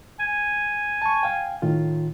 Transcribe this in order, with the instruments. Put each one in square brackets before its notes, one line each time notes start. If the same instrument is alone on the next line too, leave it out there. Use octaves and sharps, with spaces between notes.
[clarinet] G#5
[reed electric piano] A5 C#6
F5 G5
A2 D#3 F4